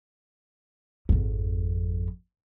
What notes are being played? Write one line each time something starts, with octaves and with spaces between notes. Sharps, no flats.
G#1 F2